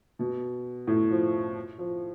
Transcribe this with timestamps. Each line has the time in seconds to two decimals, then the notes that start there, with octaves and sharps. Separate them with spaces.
0.19 B2
0.87 A2
1.11 F3
1.79 F3